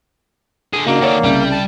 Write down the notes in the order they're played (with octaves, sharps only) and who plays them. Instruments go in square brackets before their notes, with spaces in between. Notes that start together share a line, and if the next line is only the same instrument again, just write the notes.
[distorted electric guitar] D3 G#4
[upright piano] C#3 F#4 [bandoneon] A#3 [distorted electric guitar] D4 D#4
[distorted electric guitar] D#3 A4 [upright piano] C#5 D5 F#5
[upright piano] C2 C#3 [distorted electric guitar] G3
[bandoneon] A5